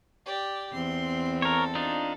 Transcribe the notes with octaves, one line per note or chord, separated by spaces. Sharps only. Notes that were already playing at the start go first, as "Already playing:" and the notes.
G4 D5
E2 C4 C6
A4 A#4 C#5
D4 D#4 F4